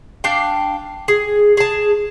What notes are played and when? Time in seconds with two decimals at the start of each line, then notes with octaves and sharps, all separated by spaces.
0.24 D4 F5 G5
1.08 G#4
1.57 G#4 A5